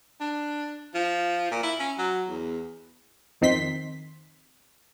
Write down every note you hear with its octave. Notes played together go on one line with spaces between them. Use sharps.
D4
F3
A#2
E4
C#4
F#3
E2
F2 D#3 C4 D#4 C6 B6